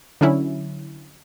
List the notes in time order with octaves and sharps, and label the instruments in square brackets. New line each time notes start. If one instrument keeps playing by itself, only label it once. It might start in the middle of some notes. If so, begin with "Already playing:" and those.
[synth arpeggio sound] D3 F#3 C#4 E4